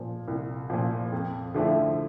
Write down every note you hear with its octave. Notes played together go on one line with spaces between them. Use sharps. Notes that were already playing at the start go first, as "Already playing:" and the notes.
Already playing: A#2 F3
C2
A#2 F3
F2
D3 F3 A3 E4